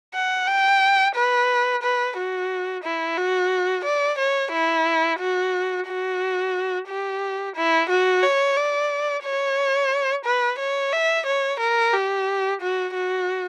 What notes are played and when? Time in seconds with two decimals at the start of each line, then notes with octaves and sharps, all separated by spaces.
0.14 F#5
0.48 G5
1.15 B4
1.83 B4
2.17 F#4
2.84 E4
3.18 F#4
3.85 D5
4.19 C#5
4.53 E4
5.20 F#4
5.88 F#4
6.88 G4
7.56 E4
7.89 F#4
8.23 C#5
8.57 D5
9.24 C#5
10.25 B4
10.59 C#5
10.93 E5
11.26 C#5
11.60 A#4
11.94 G4
12.61 F#4
12.94 F#4